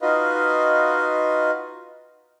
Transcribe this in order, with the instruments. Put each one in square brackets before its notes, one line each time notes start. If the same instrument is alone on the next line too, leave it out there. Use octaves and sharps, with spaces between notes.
[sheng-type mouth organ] D#4 F4 F#4 B4 D#5 F5